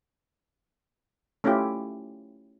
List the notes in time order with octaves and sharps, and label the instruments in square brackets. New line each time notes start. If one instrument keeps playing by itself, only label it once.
[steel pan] A3 C#4 E4 F4 G4